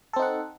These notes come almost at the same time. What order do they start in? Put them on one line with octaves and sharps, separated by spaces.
A4 C4 D#4 F#5